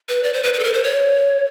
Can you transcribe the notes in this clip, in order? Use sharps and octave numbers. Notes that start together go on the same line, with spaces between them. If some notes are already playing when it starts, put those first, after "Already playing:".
B4
D5
C5
B4
B4
A4
A#4
C5
C#5